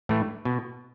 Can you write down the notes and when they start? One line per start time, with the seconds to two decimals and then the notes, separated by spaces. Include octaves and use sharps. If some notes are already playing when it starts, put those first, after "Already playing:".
0.09 A2 E3 A3
0.45 B2